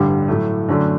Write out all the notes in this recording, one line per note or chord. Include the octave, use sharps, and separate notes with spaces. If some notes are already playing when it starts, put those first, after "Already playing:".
Already playing: A1 G2 D3 G3
A2 F#3 A3
F#2 D3 F#3 A3 D4